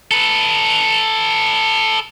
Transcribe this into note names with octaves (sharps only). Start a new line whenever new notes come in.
A4 B4